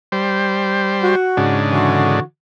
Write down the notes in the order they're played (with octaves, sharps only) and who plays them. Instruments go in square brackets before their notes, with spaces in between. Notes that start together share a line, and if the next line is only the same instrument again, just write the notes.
[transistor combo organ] G3 C5
[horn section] F#4
[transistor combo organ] G#2 C#3 D4
[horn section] D3 E3 F#4